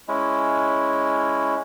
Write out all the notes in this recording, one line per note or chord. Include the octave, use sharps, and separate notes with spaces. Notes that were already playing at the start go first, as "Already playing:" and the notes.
G#3 C#4 E4